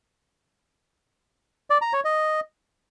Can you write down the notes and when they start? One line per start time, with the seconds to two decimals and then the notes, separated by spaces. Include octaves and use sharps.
1.70 D5
1.82 A#5
1.93 C#5
2.05 D#5